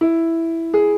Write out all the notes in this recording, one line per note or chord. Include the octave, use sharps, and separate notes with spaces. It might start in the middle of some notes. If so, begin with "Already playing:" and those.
E4
G#4